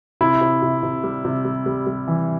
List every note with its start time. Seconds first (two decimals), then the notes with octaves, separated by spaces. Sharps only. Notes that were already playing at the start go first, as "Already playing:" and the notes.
0.21 C3 E4
0.41 C3
0.63 C3
0.83 C3
1.04 G3
1.25 C3
1.45 G3
1.66 G3
1.87 G3
2.08 E3